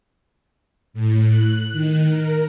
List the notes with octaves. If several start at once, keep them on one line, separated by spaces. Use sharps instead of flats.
A2
F#6
D#3
A#4